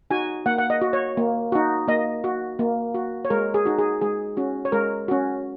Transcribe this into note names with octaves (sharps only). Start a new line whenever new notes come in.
D#4 F#4 G#5
A#3 F#5
F#5
D#5
F#4
C#5
A#3
D#4 F#4
A#3 D#5
F#4
A#3
F#4
C#5
G#3 A#4
G#4
D#4 F#4
G#4
G#3 G#4
C#4 F#4
C#5
G#3 A#4
C#4 F#4